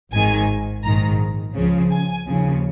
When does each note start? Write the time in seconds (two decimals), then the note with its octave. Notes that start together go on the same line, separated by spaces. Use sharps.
0.12 G#1 G#2 D#3 G#5
0.83 A#1 G#2 D#3 A#5
1.55 C#2 C#3 F3
1.91 G#5
2.26 D#2 C#3 F3